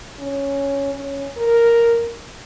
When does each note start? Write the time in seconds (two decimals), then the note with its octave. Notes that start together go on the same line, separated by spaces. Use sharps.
0.19 C#4
0.93 C#4
1.37 A#4